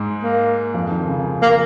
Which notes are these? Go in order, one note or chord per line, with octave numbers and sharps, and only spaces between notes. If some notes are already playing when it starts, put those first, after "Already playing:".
Already playing: G#2 G#3
A#3
F2 F3
D#3
C#3
A#3